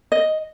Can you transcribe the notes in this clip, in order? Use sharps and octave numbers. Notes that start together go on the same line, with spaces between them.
D#5